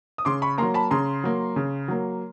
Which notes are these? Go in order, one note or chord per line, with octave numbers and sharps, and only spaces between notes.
D#6
C#3 C6 D6
B5 C#6
F#3 A#3 A#5 C6
A5 B5
C#3 A#5 C6
F#3 A#3
C#3
F#3 A#3